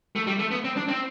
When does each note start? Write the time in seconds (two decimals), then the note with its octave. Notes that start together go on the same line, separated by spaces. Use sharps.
0.16 A3
0.27 G3
0.39 A3
0.51 B3
0.64 C4
0.77 D4
0.89 C4